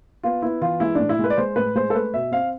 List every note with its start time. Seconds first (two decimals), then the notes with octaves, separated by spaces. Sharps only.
0.23 B3 F4
0.42 B3 E4
0.61 E3 F4
0.80 G#3 E4
0.95 A2 D4
1.09 E4
1.19 G#3 B4
1.30 D5
1.37 G#3 C5
1.56 A2 B4
1.76 G#3 C5
1.90 A4
1.94 A3 B4
2.14 B2 E5
2.32 C4 F5